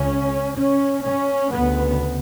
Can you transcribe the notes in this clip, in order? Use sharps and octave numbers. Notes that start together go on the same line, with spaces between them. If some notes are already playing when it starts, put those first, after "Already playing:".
Already playing: C#2 C#3 C#4
C#4
C#4
D2 C#3 B3